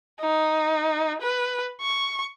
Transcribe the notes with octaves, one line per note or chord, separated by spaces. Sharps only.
D#4
B4
C#6